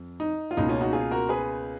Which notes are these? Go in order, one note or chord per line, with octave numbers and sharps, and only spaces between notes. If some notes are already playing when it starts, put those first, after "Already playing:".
Already playing: F2
D#4
F4
C#2 B2 A#3 D#4
C#4 F4
D#4 F#4
F4 G#4
F#4 A#4
G#4 B4